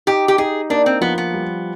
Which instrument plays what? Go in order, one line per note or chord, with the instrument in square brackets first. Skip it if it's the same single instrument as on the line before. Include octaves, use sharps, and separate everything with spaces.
[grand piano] D#4 [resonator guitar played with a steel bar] G4
[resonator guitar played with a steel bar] G4
[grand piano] D#4 [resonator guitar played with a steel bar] G#4
[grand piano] A#3 [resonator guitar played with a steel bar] D4
[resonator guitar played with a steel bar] C4
[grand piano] F3 [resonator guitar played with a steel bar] B3
[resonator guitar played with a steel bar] B3
[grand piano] G3